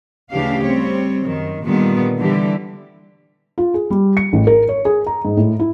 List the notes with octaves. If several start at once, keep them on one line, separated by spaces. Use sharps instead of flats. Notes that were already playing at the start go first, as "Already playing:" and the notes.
D2 C#3 E3 D4 G4 F5
G3 C4 C#5
F#2 D#3
A#2 D3 D#3 G3 B3
D3 E3 G3 G4
F4
G#4
G3
C#7
A1
A#4
C#5
G#4
A#5
G#2
A2
E4